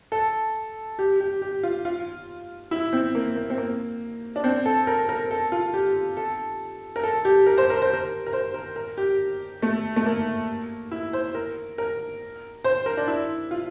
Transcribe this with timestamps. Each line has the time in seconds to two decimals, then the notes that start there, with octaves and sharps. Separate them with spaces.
0.12 A4
0.99 G4
1.20 G4
1.42 G4
1.63 F4
1.85 F4
2.71 E4
2.93 C4
3.15 A#3
3.36 A#3
3.50 C4
3.58 A#3
4.36 D4
4.44 C4
4.66 A4
4.87 A#4
5.09 A#4
5.31 A4
5.52 F4
5.74 G4
6.17 A4
6.96 A#4
7.03 A4
7.25 G4
7.46 A#4
7.58 C5
7.70 A#4
7.82 C5
7.93 A#4
8.26 A#4
8.33 C5
8.54 A#4
8.76 A#4
8.97 G4
9.62 A3
9.96 A3
10.06 A#3
10.91 E4
11.13 C5
11.35 A#4
11.78 A#4
12.64 C5
12.86 A#4
12.97 D4
13.08 E4
13.51 F4